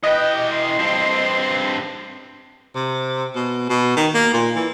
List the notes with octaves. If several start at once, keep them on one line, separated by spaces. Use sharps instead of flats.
E3 B4 D#5 G5
G4
C6
G2 C4
C3
B2
B2
D#3
A#3
A#2
E3